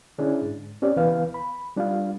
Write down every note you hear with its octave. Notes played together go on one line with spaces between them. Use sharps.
D3 C#4 D4 E4 G#4
G#2
C4 C#4 G4 D5
C#2 E3 B3 B4 F5
B5
G3 D4 F4 F5